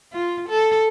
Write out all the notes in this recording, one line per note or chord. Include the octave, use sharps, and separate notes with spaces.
F4
A4